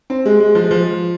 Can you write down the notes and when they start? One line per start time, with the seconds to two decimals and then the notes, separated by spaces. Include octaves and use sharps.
0.10 C4
0.26 G#3
0.40 G#3
0.55 F3
0.64 G#3
0.71 F3